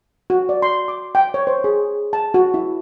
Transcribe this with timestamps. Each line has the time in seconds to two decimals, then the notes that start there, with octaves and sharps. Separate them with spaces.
0.30 F#4
0.49 D5
0.62 C6
0.88 D6
1.15 G5
1.34 C#5
1.47 C5
1.64 G#4
2.13 A5
2.34 F#4
2.54 E4